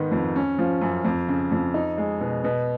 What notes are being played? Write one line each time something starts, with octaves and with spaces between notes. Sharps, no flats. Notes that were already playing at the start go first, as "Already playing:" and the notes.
Already playing: G#2 D#3 B3
F2
C#4
F3
F#2
F2
C#3
F2
D#4
G#3
B2
B2